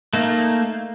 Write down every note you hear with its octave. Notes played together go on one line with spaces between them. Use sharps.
A3 A#3 D#4